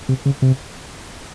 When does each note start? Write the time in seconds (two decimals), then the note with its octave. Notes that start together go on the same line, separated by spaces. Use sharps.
0.09 C3
0.26 C#3
0.42 C3